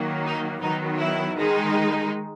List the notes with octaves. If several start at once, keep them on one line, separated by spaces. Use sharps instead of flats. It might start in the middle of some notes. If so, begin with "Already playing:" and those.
Already playing: D#3 F#3 A#3
D#4
D#3 F#3 B3 D#4
E4
D#3 G#3 D#4